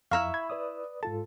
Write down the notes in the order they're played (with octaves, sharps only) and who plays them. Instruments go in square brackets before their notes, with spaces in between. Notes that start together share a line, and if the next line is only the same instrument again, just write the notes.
[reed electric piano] F2 [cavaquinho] E4 E5 C#6 [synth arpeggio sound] F5 A#5 F6
[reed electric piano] B5 [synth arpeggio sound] G#6
[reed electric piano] B4 D5 D#6
[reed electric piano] G#2 F4 A4 [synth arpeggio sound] A5